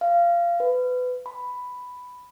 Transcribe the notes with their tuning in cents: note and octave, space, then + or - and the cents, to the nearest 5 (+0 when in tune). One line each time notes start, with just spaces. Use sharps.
F5 -20
B4 +25
B5 +5